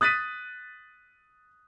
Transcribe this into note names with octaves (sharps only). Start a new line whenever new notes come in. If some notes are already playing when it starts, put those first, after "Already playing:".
D#6 F#6 A6 B6 D#7